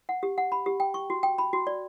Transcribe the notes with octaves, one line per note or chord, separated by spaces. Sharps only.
F#5
G4
F#5
B5
G4
G5
C#6
F#4
G5
B5
F#4
D5